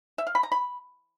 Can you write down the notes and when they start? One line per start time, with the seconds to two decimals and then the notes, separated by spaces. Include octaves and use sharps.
0.18 E5
0.27 F5
0.35 B5
0.43 A#5
0.52 B5